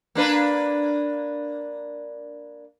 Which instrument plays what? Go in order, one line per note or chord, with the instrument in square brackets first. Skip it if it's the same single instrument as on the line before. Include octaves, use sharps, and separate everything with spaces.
[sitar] A#3 D4 B4